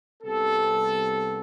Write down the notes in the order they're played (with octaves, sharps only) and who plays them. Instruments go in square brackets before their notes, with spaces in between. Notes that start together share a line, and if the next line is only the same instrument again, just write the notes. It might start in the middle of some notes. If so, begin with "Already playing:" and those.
[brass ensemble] C2 C3 G3 B3 A4